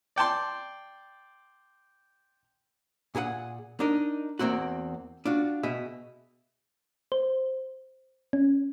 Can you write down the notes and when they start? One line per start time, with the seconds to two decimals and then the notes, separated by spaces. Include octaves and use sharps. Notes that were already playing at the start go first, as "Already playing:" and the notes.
0.16 D5 G5 A5 C6
3.15 A#2 G#4 A4 F#5
3.80 D4 D#4 A#4
4.39 E2 A#3 C4 F#4
5.25 D4 F4 F#4
5.63 B2 G#4 E5
7.12 C5
8.33 C#4